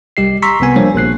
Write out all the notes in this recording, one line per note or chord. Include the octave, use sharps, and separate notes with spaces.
C2 G3 G4 D#5 C7
A#5 C6 C#6 E6 B6
C2 C3 B3 G#5
F3 G3 A#3 D4 C5 C#5
A#1 A#3 F#6 C7